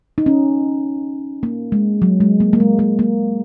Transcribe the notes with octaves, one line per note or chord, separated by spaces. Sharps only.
D#4
C#4
A#3
G#3
F#3
G#3
A#3
A#3
G#3
A#3
A#3